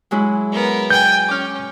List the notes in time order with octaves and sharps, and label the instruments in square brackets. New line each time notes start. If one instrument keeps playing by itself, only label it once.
[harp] F#3 G#3 E4
[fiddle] B3 A#4
[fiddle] G5 G#5 [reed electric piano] G6
[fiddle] C#4 [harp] D6 F6